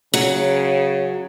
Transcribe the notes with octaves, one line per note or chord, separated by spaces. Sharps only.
C#3 F#3